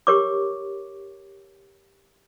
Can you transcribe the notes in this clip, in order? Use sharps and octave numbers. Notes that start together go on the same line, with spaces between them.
G4 A#4 C#5 C#6 D6